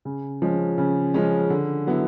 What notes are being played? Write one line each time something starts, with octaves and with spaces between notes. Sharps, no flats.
C#3
F3 G#3 C#4
C#3
F3 G#3 C#4
D3
F#3 B3 E4